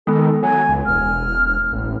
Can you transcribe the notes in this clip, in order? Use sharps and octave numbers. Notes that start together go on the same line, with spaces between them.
D#3 G#3 B3 A4
F#3 G#5
C#2
E1 F6
A1